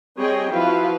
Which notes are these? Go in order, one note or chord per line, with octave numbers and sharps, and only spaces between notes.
G3 C4 G#4 C#5 D#5 G5
F3 E4 F#4 B4 F5